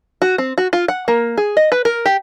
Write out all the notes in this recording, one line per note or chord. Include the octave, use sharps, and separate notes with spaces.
F#4
C4
F#4
F4
F#5
A#3
G#4
D#5
B4
A#4
G4